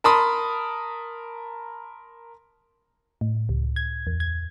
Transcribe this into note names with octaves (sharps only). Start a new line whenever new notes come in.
A#4 A5 B5 C6 D#6
A2
C#2
G#6
E2
G#6